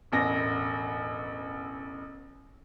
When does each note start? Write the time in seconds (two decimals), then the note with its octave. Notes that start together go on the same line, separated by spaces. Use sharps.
0.12 E1 A1 A#6